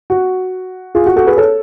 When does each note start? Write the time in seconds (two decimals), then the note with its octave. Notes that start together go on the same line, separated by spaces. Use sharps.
0.10 F#4
0.95 F4 G#4
1.06 F#4
1.16 F#4 A4
1.27 G#4 B4
1.37 A4 C#5